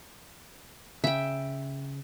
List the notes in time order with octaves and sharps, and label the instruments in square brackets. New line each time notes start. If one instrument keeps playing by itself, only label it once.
[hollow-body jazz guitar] C#3 [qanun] E5 G5